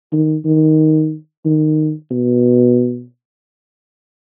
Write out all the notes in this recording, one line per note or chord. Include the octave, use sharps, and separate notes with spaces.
D#3
D#3
D#3
B2